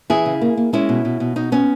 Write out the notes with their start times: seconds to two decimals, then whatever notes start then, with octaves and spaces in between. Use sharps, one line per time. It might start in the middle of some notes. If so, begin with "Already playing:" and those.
0.10 E3 E4 G#4
0.26 C#3
0.41 A#3
0.57 A#3
0.73 G#3 C#4 E4
0.89 B2
1.05 B2
1.20 B2
1.36 B2 D#4
1.52 B3 C#4